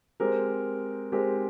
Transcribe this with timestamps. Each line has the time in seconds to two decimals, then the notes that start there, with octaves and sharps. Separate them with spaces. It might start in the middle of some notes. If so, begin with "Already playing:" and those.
0.20 G#3 C4 G4 A#4
1.12 G#3 C4 G4 A#4